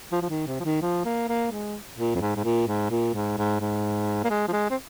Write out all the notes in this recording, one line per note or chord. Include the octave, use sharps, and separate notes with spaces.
F3
F3
D#3
C3
F3
D#3
F3
A#3
A#3
G#3
A#2
F2
G#2
G#2
A#2
G#2
A#2
G#2
G#2
G#2
A#3
G#3
F3
G#3
C4